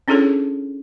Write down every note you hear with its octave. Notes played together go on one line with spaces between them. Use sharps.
C#4 D4 E4 G#4 A4 C#5